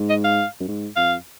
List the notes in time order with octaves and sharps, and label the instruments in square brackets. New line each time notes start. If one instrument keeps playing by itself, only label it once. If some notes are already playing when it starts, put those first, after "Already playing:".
Already playing: [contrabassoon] G#2
[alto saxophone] D#5
F5
[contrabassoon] F#2
G#2
[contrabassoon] F2 [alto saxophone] F5